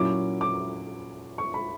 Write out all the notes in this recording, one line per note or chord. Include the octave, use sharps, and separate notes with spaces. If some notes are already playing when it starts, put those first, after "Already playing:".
Already playing: A#2 F#3 C#4 E4 D6
D6
C#6
B5